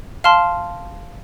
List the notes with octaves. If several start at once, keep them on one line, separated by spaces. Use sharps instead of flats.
F5 A5 C6 F6